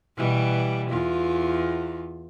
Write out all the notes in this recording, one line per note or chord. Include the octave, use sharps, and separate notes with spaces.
B2 E3 G3
E2 F4